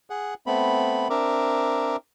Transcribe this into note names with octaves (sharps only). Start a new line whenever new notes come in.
G#4 F#5
A3 B3 C4 B5
C4 D4 A#4 E5 D6